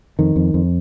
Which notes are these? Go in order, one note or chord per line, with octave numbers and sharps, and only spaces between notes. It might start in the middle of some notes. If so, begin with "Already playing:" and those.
F2 D#3
F2
F2